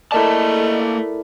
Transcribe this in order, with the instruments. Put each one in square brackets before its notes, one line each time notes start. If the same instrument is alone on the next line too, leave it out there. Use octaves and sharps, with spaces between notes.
[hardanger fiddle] A3 [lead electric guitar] A#3 A5 [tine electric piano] E4 A#4 D5 [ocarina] D#5